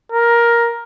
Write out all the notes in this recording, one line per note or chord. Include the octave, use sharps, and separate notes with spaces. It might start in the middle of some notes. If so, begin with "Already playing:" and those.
A#4